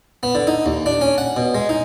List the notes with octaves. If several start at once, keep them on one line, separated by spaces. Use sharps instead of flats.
B3
D3
D#4
D#2
D4
C#4
F#5
B2
G#3
D#4